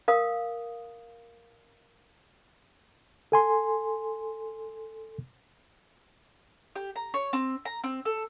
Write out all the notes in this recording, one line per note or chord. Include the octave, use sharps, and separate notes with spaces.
A#4 F5 D#6
A4 G#5 C6
G4
A#5
C#5
C4
A#5
C4
A4